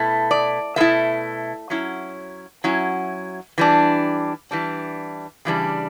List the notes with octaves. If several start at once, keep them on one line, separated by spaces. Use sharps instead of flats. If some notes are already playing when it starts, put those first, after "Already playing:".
Already playing: B2 A3 E4
D5
B2 A3 E4 E5
F#3 C#4 E4
F#3 C#4 E4
E3 G3 D4
E3 G3 D4
C#3 E3 G3 D4